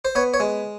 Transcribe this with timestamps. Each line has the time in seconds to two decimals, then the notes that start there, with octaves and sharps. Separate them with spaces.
0.05 C5
0.15 B3 C#5
0.34 C#5
0.40 G#3